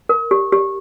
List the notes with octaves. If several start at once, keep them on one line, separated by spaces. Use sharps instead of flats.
A#4
G4
G4